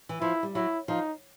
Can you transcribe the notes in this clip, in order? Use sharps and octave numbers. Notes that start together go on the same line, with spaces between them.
E3
F3 E4
G3
F#3 E4
F3 D#4